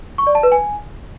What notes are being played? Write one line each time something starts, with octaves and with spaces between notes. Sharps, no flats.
C#6
D5
A5
B4
G#5